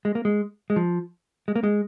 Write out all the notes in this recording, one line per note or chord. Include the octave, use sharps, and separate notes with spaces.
G#3
A#3
G#3
G#3
F3
G#3
A#3
G#3